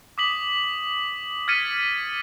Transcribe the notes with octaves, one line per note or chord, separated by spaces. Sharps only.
D6 D#6 B6 F#7
F6 G#6 A6 B6 C#7 D#7